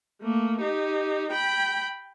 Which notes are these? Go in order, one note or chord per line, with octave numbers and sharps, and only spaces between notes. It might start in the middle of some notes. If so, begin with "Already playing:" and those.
A3 A#3
D#4 G4
G5 B5